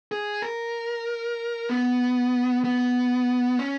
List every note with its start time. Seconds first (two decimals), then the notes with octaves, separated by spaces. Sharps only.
0.12 G#4
0.42 A#4
1.69 B3
2.64 B3
3.59 C#4